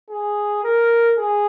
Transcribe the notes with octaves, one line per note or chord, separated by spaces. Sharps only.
G#4
A#4
G#4